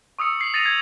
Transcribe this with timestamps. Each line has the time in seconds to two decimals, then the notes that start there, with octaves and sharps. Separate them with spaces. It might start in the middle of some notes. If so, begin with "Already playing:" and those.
0.19 C#6 D#6 E6 C#7
0.40 C7 F#7
0.53 D#6 A6 A#6 C#7 D#7 F7
0.66 G#6 C7 F7